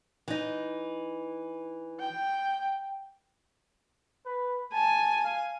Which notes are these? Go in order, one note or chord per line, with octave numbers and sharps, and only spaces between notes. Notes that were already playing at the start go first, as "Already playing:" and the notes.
E3 D#4
G5
B4
G#5 A5
F5